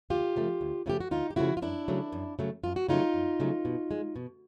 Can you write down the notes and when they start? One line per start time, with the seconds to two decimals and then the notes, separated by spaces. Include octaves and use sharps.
0.10 D2 F4 G4
0.36 C#3 F3 A3
0.61 D2
0.86 C#3 F3 A3 G4
1.00 F#4
1.11 D2 D#4 F4
1.30 G4
1.36 C#3 F3 A3 E4 F#4
1.57 F4
1.62 F#2 D4 E4
1.88 C#3 F#3 A3
2.12 F#2
2.39 C#3 F#3 A3
2.63 F#2 F4
2.76 F#4
2.88 C#3 F#3 A3 D#4 F4
3.14 F#2
3.40 C#3 F#3 A3
3.65 B2
3.91 G#3
4.16 B2